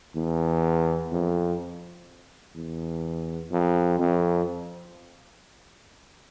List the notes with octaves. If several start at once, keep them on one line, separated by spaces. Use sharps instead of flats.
E2
F2
E2
F2
F2